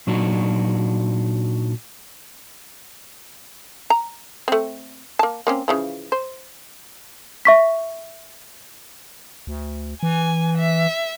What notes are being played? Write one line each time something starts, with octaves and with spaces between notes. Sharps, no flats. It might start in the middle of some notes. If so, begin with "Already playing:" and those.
A#2 F#3 D4 D#4 F#4
A#5
A3 C4
A#3 A5
A#3 C4 C#4
C#3 E3 F3
C5
E5 C#6 B6
D2
E3 G#5
E5